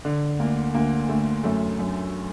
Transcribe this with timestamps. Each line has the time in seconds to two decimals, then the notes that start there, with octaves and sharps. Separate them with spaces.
0.05 D3
0.39 D2 A#3
0.74 D2 A#3
1.09 D2 A3
1.44 F#2 A3
1.79 F#2